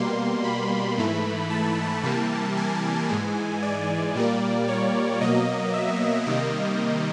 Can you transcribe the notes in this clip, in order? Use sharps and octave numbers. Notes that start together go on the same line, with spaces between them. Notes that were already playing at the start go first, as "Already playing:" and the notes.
Already playing: B2 G3 A#3 C6
B5
G#2 E3 A3
A5
C3 E3 G3 A#3
G#5
G#2 E3 G#3
D5
A#2 G3 A#3
C#5
B2 F#3 A#3 D#5
E5
C3 D#3 G3 A#3 D#5